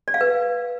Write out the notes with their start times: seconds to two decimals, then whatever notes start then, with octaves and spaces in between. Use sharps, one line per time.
0.08 D5
0.14 F5
0.21 B4